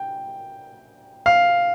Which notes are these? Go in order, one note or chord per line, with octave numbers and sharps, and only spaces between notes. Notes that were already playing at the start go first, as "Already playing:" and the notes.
Already playing: G5
F5